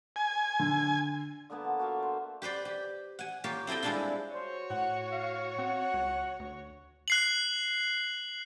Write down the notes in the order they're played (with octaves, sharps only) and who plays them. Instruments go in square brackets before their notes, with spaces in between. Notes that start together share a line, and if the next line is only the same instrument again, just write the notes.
[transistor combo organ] G#5
[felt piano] D3
[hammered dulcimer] D3 A#3 B3 A5
F3
F#4 D5 E5 F5
C5
[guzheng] G4 B4 C5 D5
G4
F#5 G#5
A#3 F4 G4 C#5
C4 E4 A4 D#5 G5
G3 G#3 C4 D4 E4 F4
[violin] F#4 C#5 [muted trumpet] C5
[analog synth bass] A2 [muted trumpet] F#5
[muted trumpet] F5
[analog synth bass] C4 [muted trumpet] F#5
[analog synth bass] C#2
D2
[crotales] F#6 C7 F#7